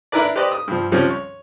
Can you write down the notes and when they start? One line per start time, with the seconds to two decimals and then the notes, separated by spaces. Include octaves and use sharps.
0.12 D4 E4 A#4 B4 D5
0.36 G4 B4 C5 D5 D#5
0.52 D#6
0.68 G2 F3
0.92 C#2 F3 G3 C4 C#4
1.10 C#5